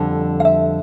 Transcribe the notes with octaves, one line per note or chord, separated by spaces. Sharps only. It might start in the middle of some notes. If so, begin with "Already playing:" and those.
Already playing: F2 D3 G3
F5
E5